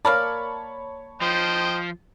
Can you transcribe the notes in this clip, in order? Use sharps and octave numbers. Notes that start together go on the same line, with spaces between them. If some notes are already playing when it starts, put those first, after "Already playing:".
A#3 A#4 C#5 D5 A5 B5
F3 C5 D#5 G5